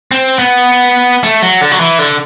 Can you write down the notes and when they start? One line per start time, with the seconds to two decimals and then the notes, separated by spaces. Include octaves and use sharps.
0.11 C4
0.39 B3
1.24 A3
1.42 F#3
1.61 D3
1.71 F#3
1.80 E3
1.99 D3